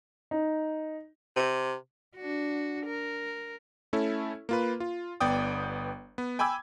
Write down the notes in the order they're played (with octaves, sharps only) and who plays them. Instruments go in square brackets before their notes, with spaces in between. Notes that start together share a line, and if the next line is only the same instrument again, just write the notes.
[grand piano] D#4
[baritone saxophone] C3
[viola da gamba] D4 F#4
A#4
[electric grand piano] A3 C#4 E4 A4
A#3 F4 B4
F4
G1 B3 D5 G5 D#6
B3
G5 G#5 B5 D6 E6 G#6